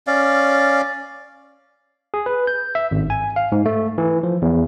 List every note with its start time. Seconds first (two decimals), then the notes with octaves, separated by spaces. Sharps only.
0.07 C#4 D5 F5
2.14 G#4
2.26 B4
2.47 G6
2.75 E5
2.91 G#1
3.10 G#5
3.36 F5
3.52 G#2
3.66 A3
3.98 E3
4.23 F3
4.42 E2